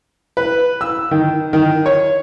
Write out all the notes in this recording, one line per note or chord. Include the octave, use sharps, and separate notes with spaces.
B4
E6
D#3
D#3
C#5